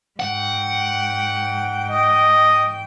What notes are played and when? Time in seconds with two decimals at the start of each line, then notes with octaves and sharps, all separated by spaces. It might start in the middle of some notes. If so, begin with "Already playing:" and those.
0.20 G#2 F#5 G5
1.91 D#5